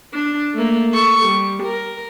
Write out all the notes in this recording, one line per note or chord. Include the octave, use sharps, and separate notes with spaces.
D4
A3 A#3
A4 C#6
G3
A#4